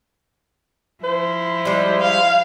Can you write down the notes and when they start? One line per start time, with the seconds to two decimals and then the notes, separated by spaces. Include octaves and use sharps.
1.04 F3 E4 C5
1.65 G3 G#3
2.01 F5